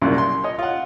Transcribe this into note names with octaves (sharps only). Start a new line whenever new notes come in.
C2 F#2 A#2 C#3
C6
C#5 D#5
F4 F#5